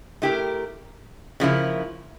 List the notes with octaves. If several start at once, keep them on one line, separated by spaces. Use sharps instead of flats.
A3 E4 G4 A#4
C#3 F3 A#3 E4